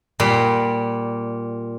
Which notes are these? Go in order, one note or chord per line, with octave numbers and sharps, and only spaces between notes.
A#2 G3